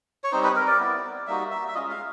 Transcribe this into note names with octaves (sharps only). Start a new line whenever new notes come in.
C#5
G3 C4 D#4 C5
B4
A#4
D5
B3 E4
G3 A#3 D#4 F#4 E5
E5
E5
G#3 C#4 F4 D#5
F5